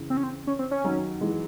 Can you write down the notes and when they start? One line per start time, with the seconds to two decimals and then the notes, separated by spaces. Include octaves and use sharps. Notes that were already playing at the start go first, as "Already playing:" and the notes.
Already playing: C#3 E3
0.10 C4
0.17 C#4
0.23 C4
0.47 C#4
0.59 C4
0.71 C#4
0.84 D#3 F#3
1.21 E3 G#3